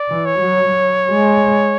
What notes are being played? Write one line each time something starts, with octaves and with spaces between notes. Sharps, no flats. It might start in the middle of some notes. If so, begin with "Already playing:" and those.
Already playing: D5
E3
C#5
F#3
F#3
G#3